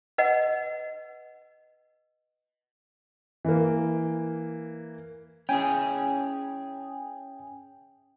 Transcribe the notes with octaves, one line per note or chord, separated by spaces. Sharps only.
B4 D#5 F#5
E3 A#3
C#4 E4 G#4 G5 G#5